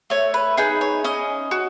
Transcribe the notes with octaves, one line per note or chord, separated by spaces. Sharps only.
A3 C#5
B4
D#4 G#4 B4
C#5
C#4 D#5
F#4